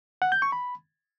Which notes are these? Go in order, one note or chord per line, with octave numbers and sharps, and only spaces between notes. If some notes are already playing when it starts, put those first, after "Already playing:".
F#5
G6
C#6
B5